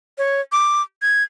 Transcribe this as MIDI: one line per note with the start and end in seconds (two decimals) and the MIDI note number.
0.18 0.41 73
0.52 0.82 86
1.02 1.23 92